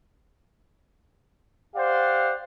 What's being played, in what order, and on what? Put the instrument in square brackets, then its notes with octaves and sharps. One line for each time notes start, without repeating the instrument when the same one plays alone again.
[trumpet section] G4 C5 D5 F5 F#5